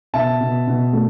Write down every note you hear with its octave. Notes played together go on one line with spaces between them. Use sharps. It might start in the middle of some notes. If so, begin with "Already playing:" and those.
B2 E5 A5
B2
B2
A3